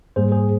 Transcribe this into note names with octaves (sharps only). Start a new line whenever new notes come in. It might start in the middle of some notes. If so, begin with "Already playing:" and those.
G#2 G3 A#3 G#4 C5
G#4 C5